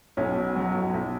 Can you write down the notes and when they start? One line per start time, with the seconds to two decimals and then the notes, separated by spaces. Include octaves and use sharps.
0.17 B1 C#4
0.37 B2
0.56 F#3
0.75 B1
0.94 B1